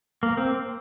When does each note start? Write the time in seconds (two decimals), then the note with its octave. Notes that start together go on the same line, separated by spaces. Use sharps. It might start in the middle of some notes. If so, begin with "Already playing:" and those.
0.23 A#3
0.37 C4